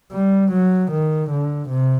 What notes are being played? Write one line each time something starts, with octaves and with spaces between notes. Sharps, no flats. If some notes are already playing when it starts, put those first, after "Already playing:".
G3
F#3
D#3
D3
C3